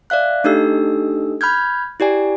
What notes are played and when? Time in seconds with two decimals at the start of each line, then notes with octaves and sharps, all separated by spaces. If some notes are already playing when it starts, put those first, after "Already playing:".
0.10 D5 E5 F5 F#6
0.44 A3 D4 D#4 G4 A4 E6
1.41 B5 F6 G6 G#6
2.00 E4 G4 D5 G#5